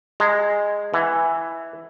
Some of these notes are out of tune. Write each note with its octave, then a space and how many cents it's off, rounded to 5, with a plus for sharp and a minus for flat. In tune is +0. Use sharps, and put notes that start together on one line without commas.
G#3 -10 A#5 -45
E3 +0 F#5 +0